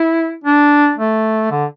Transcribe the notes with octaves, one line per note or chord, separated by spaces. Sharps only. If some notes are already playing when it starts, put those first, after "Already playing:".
Already playing: E4
D4
A3
D3